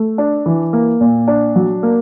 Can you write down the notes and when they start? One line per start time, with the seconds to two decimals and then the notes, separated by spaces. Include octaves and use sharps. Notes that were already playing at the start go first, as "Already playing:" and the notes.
Already playing: A3
0.18 D4
0.46 E3
0.73 A#3
1.01 A#2
1.28 D4
1.56 F#3
1.83 A#3